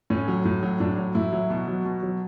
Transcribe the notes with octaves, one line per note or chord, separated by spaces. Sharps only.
A2 C#4
F#3
A2
F#3
A2 D4
F#3
A2 E4
F#3
B2
F#3
B2
F#3